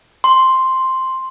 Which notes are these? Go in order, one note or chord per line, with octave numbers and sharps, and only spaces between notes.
C6